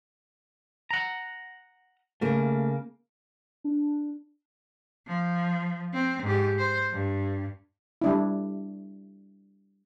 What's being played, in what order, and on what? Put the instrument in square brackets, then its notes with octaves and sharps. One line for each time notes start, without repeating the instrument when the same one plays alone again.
[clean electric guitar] F#5 A#5
[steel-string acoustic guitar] C#3 A#3 [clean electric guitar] A3
[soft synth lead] D4
[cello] F3
C4
G#2 G4
C5
G2
[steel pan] G3 D4 E4